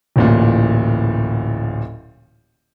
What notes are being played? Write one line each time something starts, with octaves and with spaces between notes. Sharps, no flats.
D1 A1 A#2